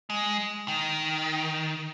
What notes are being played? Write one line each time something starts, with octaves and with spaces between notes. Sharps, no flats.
G#3
D#3